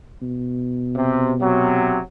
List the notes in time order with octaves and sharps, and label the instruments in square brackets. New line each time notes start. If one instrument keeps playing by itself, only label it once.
[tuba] B2
[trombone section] C3
C3 F#3